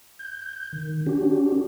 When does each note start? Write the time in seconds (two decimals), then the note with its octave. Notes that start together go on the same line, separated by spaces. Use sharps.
0.19 G6
0.73 D#3
1.06 C#4 D4 F#4 G4